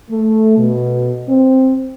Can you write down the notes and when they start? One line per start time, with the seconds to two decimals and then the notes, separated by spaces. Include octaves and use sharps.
0.10 A3
0.58 B2
1.29 C4